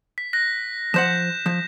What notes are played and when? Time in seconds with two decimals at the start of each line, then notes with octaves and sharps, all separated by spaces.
0.18 B6
0.33 F#6 A#6
0.94 F3 C5 F#5 G6 E7
1.46 F3